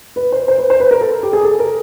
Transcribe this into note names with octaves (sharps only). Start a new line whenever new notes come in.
B4
C5
C5
B4
C5
B4
A#4
A4
G4
G#4
A4
A#4